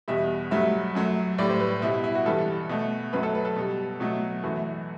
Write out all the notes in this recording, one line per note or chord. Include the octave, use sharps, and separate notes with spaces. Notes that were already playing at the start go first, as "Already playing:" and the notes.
E2 B2 G3 E5
G2 F#3 A3 E5
F#2 F#3 A3
A2 G3 D5
C5
B4
B2 G3 E4
E4
E4
F#4
G2 E3 G3 A4
B2 A3
F#2 F#3 A3 B4
A4
B4
A4
B2 G3
B2 F#3 A3
F#2 E3 A3 F#4